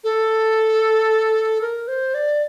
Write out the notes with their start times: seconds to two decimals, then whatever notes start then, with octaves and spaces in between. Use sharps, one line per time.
0.04 A4
1.61 A#4
1.88 C5
2.14 D5